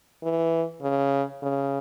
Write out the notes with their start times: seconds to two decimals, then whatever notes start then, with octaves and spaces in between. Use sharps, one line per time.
0.23 E3
0.82 C#3
1.43 C#3